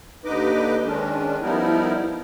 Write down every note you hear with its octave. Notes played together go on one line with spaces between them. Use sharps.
D#2 D3 D#4 B4 D#5 D6
D#3 G#3 C#4 D4
F3 G3 B3 D#4 E4 A#4